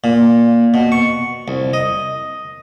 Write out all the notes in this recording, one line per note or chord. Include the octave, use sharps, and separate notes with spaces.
A#2
B2
C#6
C2
D#5